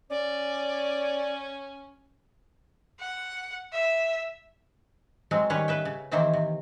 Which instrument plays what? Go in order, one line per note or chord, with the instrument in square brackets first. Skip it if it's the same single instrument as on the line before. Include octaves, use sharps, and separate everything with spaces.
[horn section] C#4 [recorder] D5
[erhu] F#5
E5
[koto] F#3 G#3 C4
D#3 G3 C#4 B4 C#5
B4 E5 G5
C#3
C3 D#3 E3 A#3 E4 C5
C3